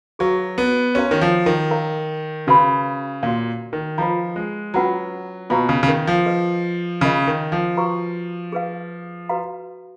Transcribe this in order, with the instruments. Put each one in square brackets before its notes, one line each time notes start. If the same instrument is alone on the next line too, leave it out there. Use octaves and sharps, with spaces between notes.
[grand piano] F#3 [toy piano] G#4 B4 F5 A#5 C#6
[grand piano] B3
[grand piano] C#4 [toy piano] F#4 A#4 C#5 F5 A#5
[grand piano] D#3
F3
D#3
[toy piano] A#4 C#5 F5 A#5
[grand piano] C#3 [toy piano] C#4 F#4 B4 F5 B5
[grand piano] A#2 [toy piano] F#4 C#5 F5
[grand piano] D#3
[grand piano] F3 [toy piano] F4 B4 D#5 A#5
[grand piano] G#3
[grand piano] F#3 [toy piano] C#4 F4 B4 F#5 A#5
[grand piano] B2 [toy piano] F4 B4 F5 A#5 C#6
[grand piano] C#3
C#3
D#3
F3
[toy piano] G#4 B4 D#5
[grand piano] C#3 [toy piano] C#4 F4 A#4 D#5
[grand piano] D#3
F3
[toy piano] F#4 B4 F5 A#5 C#6
G#4 B4 F5
F#4 B4 F5 A#5